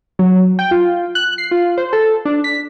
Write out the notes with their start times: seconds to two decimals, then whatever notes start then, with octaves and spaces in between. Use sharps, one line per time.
0.19 F#3
0.59 G5
0.71 F4
1.15 F#6
1.38 C7
1.51 F4
1.78 C5
1.93 A4
2.25 D4
2.44 B6